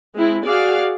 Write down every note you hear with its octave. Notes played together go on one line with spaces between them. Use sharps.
G#3 C4 E4
F#4 G#4 D5 F5